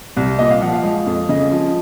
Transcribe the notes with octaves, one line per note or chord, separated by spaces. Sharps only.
C2
A#2 D#5
F5
F3 F#5
F5
G#3
F2
C#3 D#5
F3